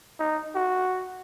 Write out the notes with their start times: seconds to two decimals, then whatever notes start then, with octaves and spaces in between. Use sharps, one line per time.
0.19 D#4
0.55 F#4